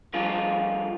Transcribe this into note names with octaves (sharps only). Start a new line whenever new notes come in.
G2 F3 F4 G#4